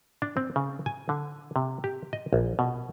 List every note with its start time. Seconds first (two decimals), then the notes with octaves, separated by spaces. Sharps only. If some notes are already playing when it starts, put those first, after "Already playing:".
0.22 D4
0.37 C4
0.56 C#3
0.86 G#5
1.09 D3
1.56 C3
1.84 G4
2.13 D#5
2.33 A#1
2.59 B2